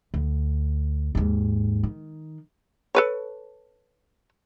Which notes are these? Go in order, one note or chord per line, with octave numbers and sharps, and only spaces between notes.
D2
D#2 G#2
D#3
A4 B4 C#5